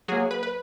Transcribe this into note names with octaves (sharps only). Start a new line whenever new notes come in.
F#3 A#3 G#4
B4
B4